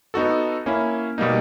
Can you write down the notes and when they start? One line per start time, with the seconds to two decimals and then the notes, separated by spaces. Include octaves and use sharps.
0.14 B3 D#4 F#4 A4
0.66 A#3 C#4 E4
1.18 B2 G3 A#3 D#4